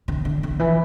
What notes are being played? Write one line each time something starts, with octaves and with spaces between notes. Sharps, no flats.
D3
D3
D3
E3